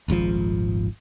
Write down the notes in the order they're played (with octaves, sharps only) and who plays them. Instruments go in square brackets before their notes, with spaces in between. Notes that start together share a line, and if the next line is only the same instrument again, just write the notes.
[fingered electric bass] D#1 G#1 G#2 F3